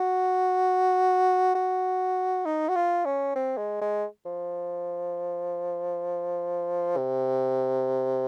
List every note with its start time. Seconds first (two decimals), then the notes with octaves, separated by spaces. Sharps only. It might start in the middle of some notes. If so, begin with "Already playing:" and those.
Already playing: F#4
1.55 F#4
2.46 D#4
2.69 F#4
2.76 F4
3.05 C#4
3.36 C4
3.58 G#3
3.81 G#3
4.25 F3
6.97 C3